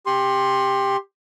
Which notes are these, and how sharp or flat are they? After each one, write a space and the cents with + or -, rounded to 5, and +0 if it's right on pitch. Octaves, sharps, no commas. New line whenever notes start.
G4 +15 C6 +15